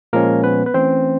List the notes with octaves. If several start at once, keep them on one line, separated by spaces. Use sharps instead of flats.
A#2 F3 G#3 A#3 C#4 A#4
B3 B4
B4
E3 A3 C4 C#4 C5